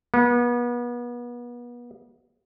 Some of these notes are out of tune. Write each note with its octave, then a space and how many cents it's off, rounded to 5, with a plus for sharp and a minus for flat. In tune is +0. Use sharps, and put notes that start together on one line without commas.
B3 -35